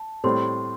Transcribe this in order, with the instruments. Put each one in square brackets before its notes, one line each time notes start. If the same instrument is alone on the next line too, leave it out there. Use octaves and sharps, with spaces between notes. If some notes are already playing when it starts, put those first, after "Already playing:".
Already playing: [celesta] A5
[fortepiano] A2 G3 C4 [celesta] C6